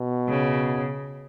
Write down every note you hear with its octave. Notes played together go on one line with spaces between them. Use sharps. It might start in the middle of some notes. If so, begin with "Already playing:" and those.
Already playing: B2
C#3